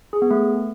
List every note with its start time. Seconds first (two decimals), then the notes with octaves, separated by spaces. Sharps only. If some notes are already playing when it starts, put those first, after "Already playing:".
0.13 G#4
0.22 B3
0.31 A3